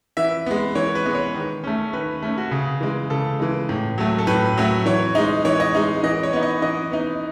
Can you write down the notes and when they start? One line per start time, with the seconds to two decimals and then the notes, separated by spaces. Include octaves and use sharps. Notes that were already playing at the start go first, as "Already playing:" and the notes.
0.17 E3 E5
0.46 G#3 B3
0.75 E3 C#5
0.95 B4
1.05 G#3 B3
1.15 C#5
1.34 D#3
1.64 A3 C#4
1.93 D#3 B4
2.23 A3 C#4
2.37 F#4
2.51 C#3 G#4
2.81 E3 G#3
3.10 C#3 A4
3.39 E3 G#3
3.69 A2
3.98 F#3 A3
4.18 A4
4.27 A2 B4
4.57 F#3 A3
4.86 E3 C#5
5.15 G#3 D#4
5.45 E3 C#5
5.60 D#5
5.75 G#3 D#4
6.03 E3 D#5
6.23 C#5
6.33 B3 D#4
6.43 D#5
6.62 E3 D#5
6.92 B3 D#4